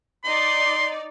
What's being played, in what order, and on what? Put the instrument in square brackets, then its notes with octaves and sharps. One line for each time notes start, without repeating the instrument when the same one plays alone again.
[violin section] D#4 D5 [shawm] C6